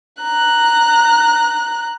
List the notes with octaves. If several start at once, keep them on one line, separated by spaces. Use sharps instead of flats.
A#5 F#6